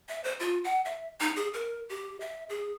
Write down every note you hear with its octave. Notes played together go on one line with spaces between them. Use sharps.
E5
C5
F4
F#5
E5
D#4
G#4
A#4
G4
E5
G#4